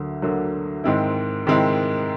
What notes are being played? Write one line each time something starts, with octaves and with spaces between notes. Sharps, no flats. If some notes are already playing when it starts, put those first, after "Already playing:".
Already playing: D2 D3 F#3 A#3
D2 D3 F#3 A#3
G#2 D#3 G#3 C4 E4
G#2 D#3 G#3 C4 E4